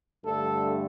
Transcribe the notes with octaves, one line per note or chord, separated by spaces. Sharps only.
G2 D3 A3 A4